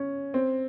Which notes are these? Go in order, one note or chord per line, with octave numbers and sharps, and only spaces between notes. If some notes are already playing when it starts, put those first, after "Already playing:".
Already playing: C#4
C4